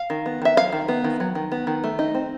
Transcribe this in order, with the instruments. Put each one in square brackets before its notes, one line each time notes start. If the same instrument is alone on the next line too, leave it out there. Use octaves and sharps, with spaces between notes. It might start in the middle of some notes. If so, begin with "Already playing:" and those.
Already playing: [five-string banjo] F5
D#3
B3
D#3 E5
F#3 F5
D#3
B3
D#3
F#3
D#3
B3
D#3
A3
D#4
C4